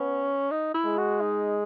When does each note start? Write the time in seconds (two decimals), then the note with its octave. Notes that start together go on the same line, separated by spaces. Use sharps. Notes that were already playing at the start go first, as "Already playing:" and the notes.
Already playing: B3 C#4
0.51 D#4
0.74 E4
0.86 G#3
0.98 F#4
1.21 D#4